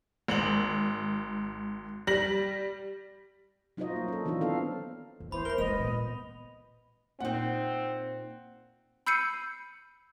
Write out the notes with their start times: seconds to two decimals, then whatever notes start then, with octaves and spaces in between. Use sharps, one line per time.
0.28 G#1 F#7
2.07 G3 A#6 F#7
3.77 F#3 D#4 F4 F#4 C5 D#5
3.96 A#3
4.08 C#4 A4
4.25 D#3 E3 C4 D4 D#4 F4
4.41 B3 C4 A4 F5
5.20 F2
5.32 E3 B3 C5 B5
5.45 A#4 B5 G7
5.58 G#3 B3 D4 D#5 F7
5.78 A#2 C4
7.20 A#2 C4 D#4 F#5
9.07 B5 E6 G6 C7 C#7 D#7